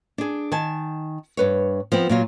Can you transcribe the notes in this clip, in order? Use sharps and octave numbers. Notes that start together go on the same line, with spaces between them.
D4 G#4
D#3 G#5 A5
G2 B4 C#5
F3 B3 C4
A#2 F#3 F4